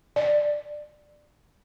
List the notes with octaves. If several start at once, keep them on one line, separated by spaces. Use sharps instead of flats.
D5